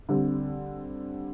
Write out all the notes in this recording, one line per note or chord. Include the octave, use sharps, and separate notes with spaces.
D3 G3 C4